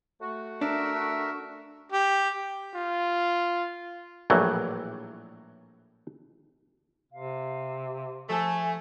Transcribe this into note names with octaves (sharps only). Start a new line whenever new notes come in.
A3 F#4
D4 A#4 E5
G4
F4
A#1 A2 E3 F#3 G3
C3 F5
F3 A3 G#5 A5